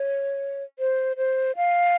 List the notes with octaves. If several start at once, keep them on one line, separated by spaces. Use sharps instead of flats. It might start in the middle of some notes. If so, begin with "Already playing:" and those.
Already playing: C#5
C5
C5
F5